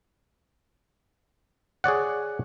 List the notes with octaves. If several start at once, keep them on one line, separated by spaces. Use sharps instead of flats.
G#4 C#5 D5 F#5